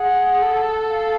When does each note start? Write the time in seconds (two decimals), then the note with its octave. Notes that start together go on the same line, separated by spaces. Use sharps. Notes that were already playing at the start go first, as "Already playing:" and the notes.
Already playing: G#4 F#5
0.42 A4
0.89 F5